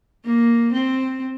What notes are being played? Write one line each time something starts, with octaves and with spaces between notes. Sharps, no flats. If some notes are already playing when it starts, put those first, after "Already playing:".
A#3
C4